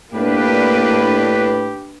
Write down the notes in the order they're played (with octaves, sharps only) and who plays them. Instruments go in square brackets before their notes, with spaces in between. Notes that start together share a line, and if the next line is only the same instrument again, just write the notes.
[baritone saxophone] A2 [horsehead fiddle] A#3 [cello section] D4 B4 [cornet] G4